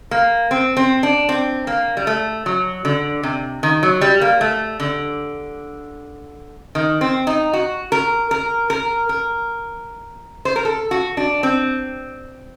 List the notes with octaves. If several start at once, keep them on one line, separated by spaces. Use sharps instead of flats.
A#3
C4
C4
D4
C4
A#3
G3
A3
F#3
D3
C3
D#3
F#3
G3
A#3
A3
D3
D#3
C4
D#4
F#4
A#4
A#4
A#4
A#4
C5
A#4
A4
F#4
D4
C4